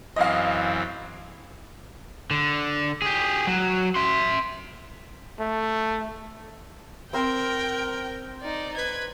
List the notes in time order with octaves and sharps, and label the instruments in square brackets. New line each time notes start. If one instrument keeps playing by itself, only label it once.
[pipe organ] F#2 E3 C4 [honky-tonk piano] D#5 F5
[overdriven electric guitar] D3
G4 G#4
F#3
E5 C6
[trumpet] A3
[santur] C4 C5 [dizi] A#4 [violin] G5
[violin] D#4 D5
[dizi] B4 [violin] G#6